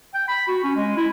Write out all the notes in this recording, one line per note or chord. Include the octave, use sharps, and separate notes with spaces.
G5
B5
F#4
C#4
G#3
E4